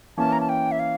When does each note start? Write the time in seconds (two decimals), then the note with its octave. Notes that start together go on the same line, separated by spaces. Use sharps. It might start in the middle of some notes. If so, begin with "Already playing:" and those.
0.17 E3 A#3 C#4 A5
0.33 A#5
0.40 A5
0.49 G5
0.72 E5
0.79 F5